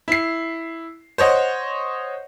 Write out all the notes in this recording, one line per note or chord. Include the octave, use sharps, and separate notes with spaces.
E4 C7
C5 C#5 D#5 F#5